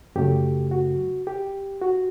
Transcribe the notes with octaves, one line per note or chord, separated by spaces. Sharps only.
F#2 C#3 F#3 A3 G4
F#4
G4
F#4